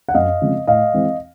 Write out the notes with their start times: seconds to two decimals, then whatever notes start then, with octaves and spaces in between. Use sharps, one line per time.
0.09 F#5
0.14 F#2 D#5 F5
0.41 C#3 F3 G#3 C4
0.67 A2 D#5 F5
0.94 E3 G#3 C4